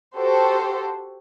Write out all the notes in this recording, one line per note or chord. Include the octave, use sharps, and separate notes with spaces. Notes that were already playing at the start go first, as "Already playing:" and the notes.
F#4 G4 A4 C5